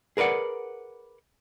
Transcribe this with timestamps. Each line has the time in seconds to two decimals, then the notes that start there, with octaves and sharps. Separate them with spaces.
0.17 G#4 A#4 B4 D5 F#5